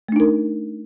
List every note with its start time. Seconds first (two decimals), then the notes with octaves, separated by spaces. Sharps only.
0.09 A3
0.12 D4
0.16 D#4
0.20 A#4